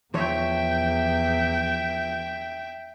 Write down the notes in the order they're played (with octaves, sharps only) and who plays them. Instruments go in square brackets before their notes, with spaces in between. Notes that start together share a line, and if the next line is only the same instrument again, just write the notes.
[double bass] E2 [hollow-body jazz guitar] F3 C#5 [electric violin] E5 G5